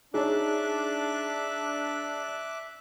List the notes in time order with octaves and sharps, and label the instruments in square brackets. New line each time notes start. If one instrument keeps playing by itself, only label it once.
[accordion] D4 [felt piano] D#4 C#5 [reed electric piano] G#4 [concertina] E5 D6 F#6